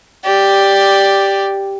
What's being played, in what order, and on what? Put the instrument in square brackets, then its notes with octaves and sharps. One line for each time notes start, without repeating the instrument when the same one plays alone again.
[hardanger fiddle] G4 D5